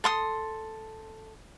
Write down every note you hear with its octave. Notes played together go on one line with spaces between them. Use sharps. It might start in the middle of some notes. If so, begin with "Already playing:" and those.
A4 C6 D#6